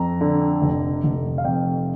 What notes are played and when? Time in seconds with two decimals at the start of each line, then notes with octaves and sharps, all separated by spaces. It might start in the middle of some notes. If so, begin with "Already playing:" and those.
Already playing: F2 A#5
0.21 D3
0.62 F1
1.04 F1
1.38 F5
1.44 F2 G5